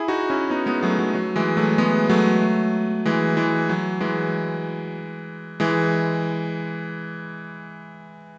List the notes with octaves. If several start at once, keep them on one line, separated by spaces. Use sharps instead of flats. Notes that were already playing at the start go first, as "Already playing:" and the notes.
Already playing: E4 G#4
D#4 F#4
C#4 E4
B3 D#4
G#3 B3
F#3 A3
F#3
F#3
E3 G#3
F#3 A3
G#3 B3
F#3 A3
E3 G#3
E3 G#3
F#3
E3 G#3
E3 G#3